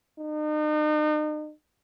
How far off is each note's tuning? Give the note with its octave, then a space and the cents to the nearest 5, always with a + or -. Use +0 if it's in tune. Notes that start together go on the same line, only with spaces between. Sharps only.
D#4 -40